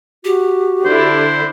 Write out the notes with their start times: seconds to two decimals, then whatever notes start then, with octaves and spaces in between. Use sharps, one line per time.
0.25 F#4 G4
0.85 D3 D4 E4 C5